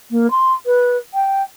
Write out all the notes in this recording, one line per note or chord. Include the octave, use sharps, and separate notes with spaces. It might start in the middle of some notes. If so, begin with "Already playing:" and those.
A#3
C6
B4
G5